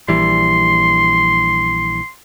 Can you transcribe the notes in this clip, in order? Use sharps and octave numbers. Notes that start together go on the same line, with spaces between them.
A#1 E3 G3 C6